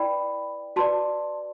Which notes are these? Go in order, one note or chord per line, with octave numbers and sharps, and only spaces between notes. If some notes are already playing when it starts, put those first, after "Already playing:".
Already playing: E4 B4 D5 G5 B5
F#4 B4 D5 A5 C6